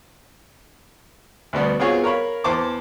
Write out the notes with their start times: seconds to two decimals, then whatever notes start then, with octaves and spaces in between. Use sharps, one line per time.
1.53 D2 B2 G3 B3
1.80 B3 C4 F4 F#4 G#4 C#5
2.04 A#4 C#5 F5 B5
2.44 E2 C5 A5 D6